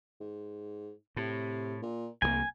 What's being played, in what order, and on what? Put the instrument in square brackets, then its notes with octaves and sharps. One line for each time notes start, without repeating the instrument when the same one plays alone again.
[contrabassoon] G#2
[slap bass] A2 [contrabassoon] C3
[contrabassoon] A#2
[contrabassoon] F1 [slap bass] C2 E3 A#3 [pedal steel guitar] G#5